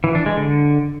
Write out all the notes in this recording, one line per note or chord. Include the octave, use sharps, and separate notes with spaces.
E3
D4
G#3
D3